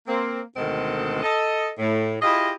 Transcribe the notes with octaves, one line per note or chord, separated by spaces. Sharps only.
A#3 C4
D2 B2 D#3 G#3 C4 A4
A4 D#5
A2
E4 F4 G4 G#4 D#5